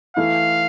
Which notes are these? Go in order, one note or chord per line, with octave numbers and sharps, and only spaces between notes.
E3 A3 E4 F5